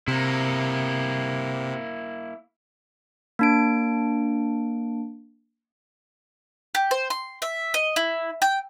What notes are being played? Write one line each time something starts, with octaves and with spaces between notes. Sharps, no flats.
C3 A#3 E4
A#3 D4 D7
G4
C5
C6
E5
D#5
E4
G5